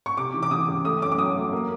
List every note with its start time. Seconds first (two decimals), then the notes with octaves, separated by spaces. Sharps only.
0.06 C#6
0.17 C3 D6
0.34 E3
0.43 D6
0.51 E3 D#6
0.68 C#2
0.85 A3 D#6
1.02 F#2 D6
1.12 D6
1.18 F#3 D#6
1.35 A3
1.52 A#3